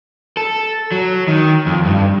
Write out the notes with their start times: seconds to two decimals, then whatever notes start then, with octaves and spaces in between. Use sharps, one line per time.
0.37 A4
0.92 F#3
1.27 D#3
1.66 F2
1.85 G2